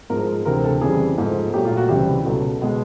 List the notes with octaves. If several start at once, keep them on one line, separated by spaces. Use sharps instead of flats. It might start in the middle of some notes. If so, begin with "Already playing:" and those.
G#2 F3 G#3 A#4
D2 C3 E3 A#4
A4
F2 C#3 E3 G3 G#4
G#2 F3 A3
A#2 F#3 A3 G4
F4
F#4
C#2 C3 E3 G3 G4
C#2 B2 F#3 A4
B2 G#3